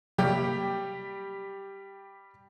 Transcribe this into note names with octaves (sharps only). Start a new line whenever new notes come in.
C3 F#3 G3 A#3 G4